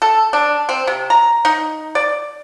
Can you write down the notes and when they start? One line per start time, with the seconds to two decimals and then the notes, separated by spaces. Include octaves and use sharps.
0.02 A4
0.33 D4
0.69 C4
0.87 C3
1.10 A#5
1.45 D#4
1.95 D5